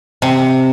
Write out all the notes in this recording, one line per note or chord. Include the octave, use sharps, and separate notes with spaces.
C3